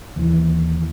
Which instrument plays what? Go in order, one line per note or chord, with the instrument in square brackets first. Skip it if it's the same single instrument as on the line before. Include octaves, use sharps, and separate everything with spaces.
[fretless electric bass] D#2 E3